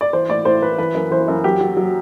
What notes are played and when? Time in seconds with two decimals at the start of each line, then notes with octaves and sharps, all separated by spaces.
0.01 D5
0.13 E3 C5
0.29 A2 D5
0.45 A2 C5
0.62 E3 B4
0.78 E3 B4
0.94 F#2
1.11 E3 C5
1.28 F#2
1.44 F#3 G4
1.61 F#3
1.77 F#3